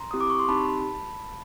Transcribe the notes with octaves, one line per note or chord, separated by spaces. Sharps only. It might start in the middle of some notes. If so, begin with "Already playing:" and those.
Already playing: A#5 C6
C4 E4 G4 D#6
D6
C#6
C6
C4 D#4 G4 A5 B5